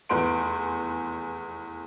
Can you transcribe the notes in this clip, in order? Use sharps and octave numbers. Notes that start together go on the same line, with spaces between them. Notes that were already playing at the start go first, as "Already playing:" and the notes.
F1 E2 B4 C6 D7